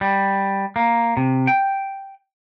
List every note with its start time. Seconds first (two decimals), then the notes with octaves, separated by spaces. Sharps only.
0.01 G3
0.76 A#3
1.17 C3
1.47 G5